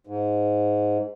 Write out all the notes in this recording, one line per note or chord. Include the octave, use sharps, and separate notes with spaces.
G#2